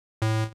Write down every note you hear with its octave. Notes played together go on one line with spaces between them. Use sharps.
A2